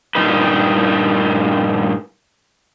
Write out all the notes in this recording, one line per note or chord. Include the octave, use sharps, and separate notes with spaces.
G2 A#2 D#4 B4